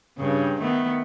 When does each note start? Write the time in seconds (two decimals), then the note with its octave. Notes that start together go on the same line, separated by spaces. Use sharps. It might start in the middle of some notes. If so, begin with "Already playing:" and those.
0.18 G2 C#3
0.60 D#3 A3 B3